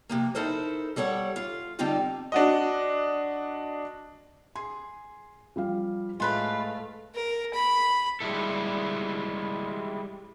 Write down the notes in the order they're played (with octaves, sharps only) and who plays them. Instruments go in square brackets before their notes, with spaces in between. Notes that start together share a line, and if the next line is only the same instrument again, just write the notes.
[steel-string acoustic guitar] C3 F3 A#3
D#4 E4 A4 A#4 C5
G3 A4 C#5 F#5
F4
D3 G3 C4 D#4 F4 G4
[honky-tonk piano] D4 F#4 D#5
[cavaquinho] G#4 [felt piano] C6
[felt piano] F3 G3 F5
[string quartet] A2 A3 F5 [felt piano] G#3 [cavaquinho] F4 B4 B5
[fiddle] A#4
B5
[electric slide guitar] G3 G#3 E4 A4